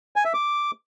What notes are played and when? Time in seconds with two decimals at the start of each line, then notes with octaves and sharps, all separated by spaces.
0.16 G#5
0.25 E5
0.34 D6